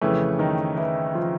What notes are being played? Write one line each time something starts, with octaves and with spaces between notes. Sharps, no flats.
F2 C#3 E3 A3
D#3 D#4
E3 E4
F3 F4